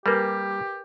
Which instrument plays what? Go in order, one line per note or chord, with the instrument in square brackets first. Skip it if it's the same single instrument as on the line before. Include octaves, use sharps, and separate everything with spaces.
[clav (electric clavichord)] G3 A#3 [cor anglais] G4 [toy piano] A#4 B4 G#5